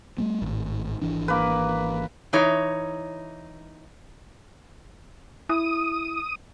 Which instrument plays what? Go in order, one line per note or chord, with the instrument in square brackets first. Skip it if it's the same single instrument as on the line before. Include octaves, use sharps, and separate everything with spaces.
[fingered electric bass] G3 A3 B3
G#1 A2
G#1 E3 D4
[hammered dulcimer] A#3 B4
[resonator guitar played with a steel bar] E3 D#4 C#5
[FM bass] E4 [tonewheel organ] D#6